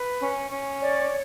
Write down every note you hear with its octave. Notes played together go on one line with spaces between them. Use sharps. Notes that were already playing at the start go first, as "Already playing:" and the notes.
Already playing: B4
C#4
C#4
C#5 D5